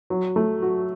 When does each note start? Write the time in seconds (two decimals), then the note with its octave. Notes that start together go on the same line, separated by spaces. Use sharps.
0.10 F#3
0.36 A3
0.62 F#4